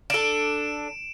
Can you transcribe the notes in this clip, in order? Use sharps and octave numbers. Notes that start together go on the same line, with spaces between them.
D4 A4 D7 E7